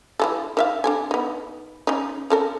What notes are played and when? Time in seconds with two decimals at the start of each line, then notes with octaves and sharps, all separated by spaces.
0.19 E3 G#3 A4
0.57 D#3 E5 F5
0.84 D4 A4 G#5
1.11 B3 D#4
1.87 C#4 D#4
2.30 C#4 A4 A#4